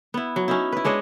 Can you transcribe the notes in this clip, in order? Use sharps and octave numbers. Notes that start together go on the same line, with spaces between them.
B3 E4
F#3
C#4 D#4 E4
E4 B4
G#3 D4 C#5 D#5